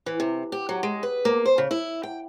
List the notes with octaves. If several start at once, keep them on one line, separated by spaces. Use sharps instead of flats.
E3
C3
G4
F#3
G#3
B4
A#3
C5
C#3
E4
G5